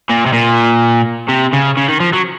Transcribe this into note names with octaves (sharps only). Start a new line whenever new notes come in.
A#2
C3
A#2
C3
C#3
C#3
D#3
F3
F#3